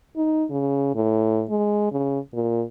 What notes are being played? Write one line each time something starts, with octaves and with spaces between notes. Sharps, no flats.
D#4
C#3
A2
G#3
C#3
A#2